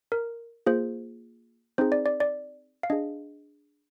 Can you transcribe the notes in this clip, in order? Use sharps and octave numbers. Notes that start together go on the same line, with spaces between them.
A#4
A#3 F4 G#4 C5
C4 D#4 G#4 C5
D5
D5
D5
F5
D4 G#4 D#5